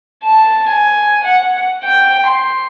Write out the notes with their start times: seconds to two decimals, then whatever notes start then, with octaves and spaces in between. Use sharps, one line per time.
0.24 A5
0.70 G#5
1.24 F#5
1.84 G5
2.27 C6